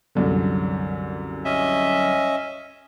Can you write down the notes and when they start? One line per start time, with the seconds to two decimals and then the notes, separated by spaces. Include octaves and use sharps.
0.15 C2 F#2 D3
1.45 C#4 D#5 E5